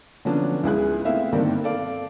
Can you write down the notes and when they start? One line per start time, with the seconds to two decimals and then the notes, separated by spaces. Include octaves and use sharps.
0.25 D3 F3 F#3 B3 C#4 D4
0.63 C#2 E4 G#4 F#6
1.05 A3 B3 C4 E4 E5 F5
1.32 G2 D3 D#3 A#3 C4
1.64 A4 D5 F5